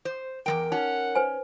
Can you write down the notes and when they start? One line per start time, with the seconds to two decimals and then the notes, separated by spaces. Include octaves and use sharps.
0.05 C5
0.46 E2 G#3 A#4 G5
0.72 C#4 D#4 F#5
1.15 B4 C5 G#5